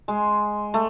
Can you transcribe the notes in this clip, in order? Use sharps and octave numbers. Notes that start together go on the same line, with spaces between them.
G#3
A3